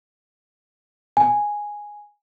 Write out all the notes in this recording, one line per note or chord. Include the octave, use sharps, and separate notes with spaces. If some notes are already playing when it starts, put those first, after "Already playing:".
G#5